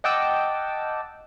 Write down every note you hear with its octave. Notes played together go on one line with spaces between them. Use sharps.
D#5 F#5 G5 A5 D6 E6